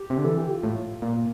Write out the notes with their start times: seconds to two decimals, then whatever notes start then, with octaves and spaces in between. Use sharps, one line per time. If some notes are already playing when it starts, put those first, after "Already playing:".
Already playing: G4
0.10 C3
0.17 D3
0.24 E3 A4
0.38 G4
0.50 F4
0.64 A2
1.02 A#2 F4